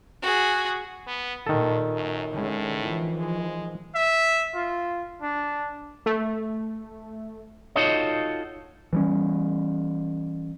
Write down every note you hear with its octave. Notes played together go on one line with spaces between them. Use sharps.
F#4 G#4
B3
G2 A#2 D#3 A4
F#2
A2 D3 G#3 C#4
E3 F3
G#3
E5
F4
D4
A3
D#4 F4 F#4 A4 C#5 D#5
E3 G3 C#4